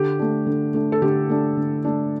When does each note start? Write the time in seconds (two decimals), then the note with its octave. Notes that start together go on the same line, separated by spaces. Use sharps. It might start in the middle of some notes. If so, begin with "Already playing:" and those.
Already playing: D3 G4
0.19 A3 D4
0.47 D3
0.74 A3 D4
0.92 A4
1.02 D3 G4
1.29 A3 D4
1.57 D3
1.85 A3 D4